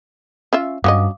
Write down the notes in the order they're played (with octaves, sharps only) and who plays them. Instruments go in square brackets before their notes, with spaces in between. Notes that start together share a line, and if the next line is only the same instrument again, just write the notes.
[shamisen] C#4 F4 E5
[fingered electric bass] G2 [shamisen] F#3 C#4 D#5 [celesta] F5 D6 D#6